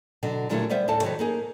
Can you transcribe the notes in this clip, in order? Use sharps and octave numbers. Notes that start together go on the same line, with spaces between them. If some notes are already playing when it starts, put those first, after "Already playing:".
B2 D3 F#3
A#2 D3 F#3 G3 A3 E4
G3 B3 B4 C5 E5
D2 A2 A4 A5
C3 D#3 F#3 F#4 B4
A#3 D#4 G#4